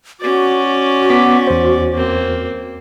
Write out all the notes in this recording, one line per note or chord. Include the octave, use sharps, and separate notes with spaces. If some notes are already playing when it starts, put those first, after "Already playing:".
C#4 F#4 D5
B3 D6 B6
E2 C5
A#3 C4